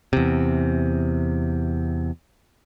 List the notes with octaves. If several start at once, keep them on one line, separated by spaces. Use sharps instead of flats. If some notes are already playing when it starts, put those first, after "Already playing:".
E2 C3